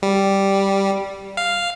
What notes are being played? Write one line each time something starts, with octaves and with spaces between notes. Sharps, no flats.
G3
F5